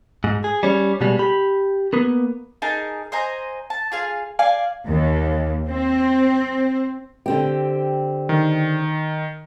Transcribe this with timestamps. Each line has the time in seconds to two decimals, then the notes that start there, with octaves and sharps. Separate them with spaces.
0.24 G#2
0.44 G#4
0.63 G3 C#4
1.01 B2 G3 G#3
1.19 G4 B5
1.93 A#3 B3
2.62 D#4 G#4 A#4 A5
3.12 C5 D#5 G#5 A#5
3.70 A5
3.92 F4 G#4 F5
4.39 D5 F5 G#5
4.86 D#2
5.68 C4
7.26 D3 C4 G4
8.29 D#3